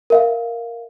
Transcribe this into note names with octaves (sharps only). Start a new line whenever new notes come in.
A#4 E5 F5